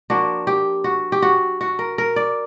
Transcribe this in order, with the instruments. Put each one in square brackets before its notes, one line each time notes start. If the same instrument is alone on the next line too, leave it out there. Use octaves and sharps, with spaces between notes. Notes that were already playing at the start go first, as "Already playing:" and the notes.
[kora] F3 A#3 D4 F#4
G4
F#4
G4
F#4
F#4
A#4
A#4
D5